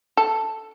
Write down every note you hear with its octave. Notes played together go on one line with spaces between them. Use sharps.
A4